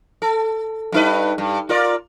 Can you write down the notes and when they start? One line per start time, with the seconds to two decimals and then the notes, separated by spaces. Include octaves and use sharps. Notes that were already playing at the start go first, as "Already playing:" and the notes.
0.22 A4
0.92 G2 D#4 B4
1.38 G2
1.69 F4 A#4 D5